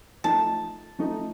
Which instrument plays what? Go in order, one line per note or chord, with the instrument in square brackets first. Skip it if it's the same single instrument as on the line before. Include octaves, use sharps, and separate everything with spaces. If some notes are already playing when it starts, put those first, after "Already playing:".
[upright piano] F3 A3 D#4 [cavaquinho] A5
[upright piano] F3 A3 D#4